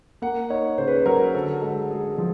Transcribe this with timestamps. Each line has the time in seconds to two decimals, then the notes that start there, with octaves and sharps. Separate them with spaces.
0.22 A#3 F#5
0.50 D#4 C#5
0.78 C#3 C5
0.87 B4
0.96 C5
1.06 F#3 A#4
1.34 D3 A4
1.62 G#3
1.91 G#3 G#4
2.18 F3 G#4